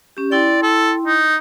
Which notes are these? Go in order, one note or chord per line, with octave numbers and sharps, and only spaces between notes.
C#4 G4
E4 D5 G5 C6
A4
D#4